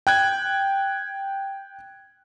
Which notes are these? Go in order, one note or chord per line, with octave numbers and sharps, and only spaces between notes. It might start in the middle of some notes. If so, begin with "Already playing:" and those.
G5 F#6 G#6